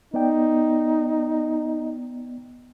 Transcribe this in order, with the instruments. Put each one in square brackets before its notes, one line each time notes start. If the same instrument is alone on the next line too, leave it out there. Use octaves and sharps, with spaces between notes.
[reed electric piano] B3 D5 G5 [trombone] D#4